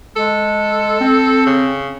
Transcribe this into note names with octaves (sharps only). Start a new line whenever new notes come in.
G#3 A4
C4
C#3